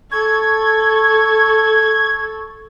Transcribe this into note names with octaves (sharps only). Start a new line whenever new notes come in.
A4 C#6 G#6